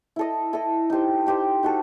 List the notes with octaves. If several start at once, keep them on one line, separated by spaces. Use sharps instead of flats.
E4 A4 D#5
E4 A4 D#5
D#4 G4 C5
D#4 G4 C5
D#4 F#4 A4